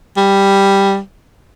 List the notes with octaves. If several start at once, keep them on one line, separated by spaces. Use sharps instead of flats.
G3